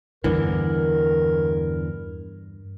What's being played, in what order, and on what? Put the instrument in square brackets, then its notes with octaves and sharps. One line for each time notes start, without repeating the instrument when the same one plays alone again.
[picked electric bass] E2 D3 E3 [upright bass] G2 [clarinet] A#4